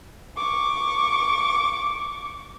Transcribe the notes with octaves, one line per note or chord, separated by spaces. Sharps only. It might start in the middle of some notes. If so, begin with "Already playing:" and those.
C#6 D6